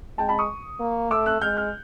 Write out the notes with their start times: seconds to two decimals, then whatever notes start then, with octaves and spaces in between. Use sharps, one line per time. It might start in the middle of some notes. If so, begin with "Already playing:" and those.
0.18 G#3 G5 A5
0.29 A5 B5
0.38 C#6 D#6
0.80 A#3
1.10 A3 D6 E6
1.26 E6 F#6
1.41 G#3 F6 G6
1.57 F6 G6